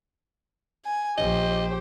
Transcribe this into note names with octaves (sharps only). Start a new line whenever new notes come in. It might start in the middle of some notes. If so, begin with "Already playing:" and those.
G#5
A#1 G4 C5 D#5